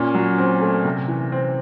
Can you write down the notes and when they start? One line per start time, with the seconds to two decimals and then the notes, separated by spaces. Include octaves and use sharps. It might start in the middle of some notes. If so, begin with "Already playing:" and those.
Already playing: A#2 C#4
0.14 F#3
0.38 C4
0.61 A3
0.85 C3
1.08 E3
1.32 C4